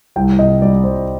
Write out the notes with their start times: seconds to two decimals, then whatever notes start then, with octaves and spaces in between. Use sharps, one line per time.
0.16 C2 G5
0.39 C3 D#5
0.62 G3 D5
0.84 C2 C5